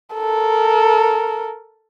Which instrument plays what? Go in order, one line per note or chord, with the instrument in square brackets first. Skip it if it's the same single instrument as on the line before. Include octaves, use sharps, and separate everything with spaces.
[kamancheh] A4 A#4